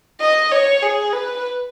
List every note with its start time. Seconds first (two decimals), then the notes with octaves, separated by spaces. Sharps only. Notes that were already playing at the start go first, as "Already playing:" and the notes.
0.21 D#5
0.52 C#5
0.82 G#4
1.13 B4